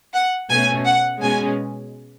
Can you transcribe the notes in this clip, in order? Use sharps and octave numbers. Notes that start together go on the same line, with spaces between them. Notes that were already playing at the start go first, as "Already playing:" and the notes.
F#5
B2 A3 C#4 G#5
F#5
B2 G#3 C#4 G#5